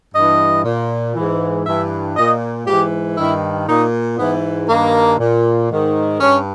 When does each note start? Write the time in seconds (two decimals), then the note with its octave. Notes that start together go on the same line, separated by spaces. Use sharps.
0.13 G2 E3 D#5
0.65 A#2
1.15 G#2 E3
1.65 G2 E3 E5
2.16 A#2 D#5
2.66 G#2 E3 G4
3.17 G2 D#3 E4
3.68 A#2 D#4
4.18 G#2 E3 B3
4.68 G2 D#3 A#3
5.19 A#2
5.70 G#2 D#3
6.20 G2 C#4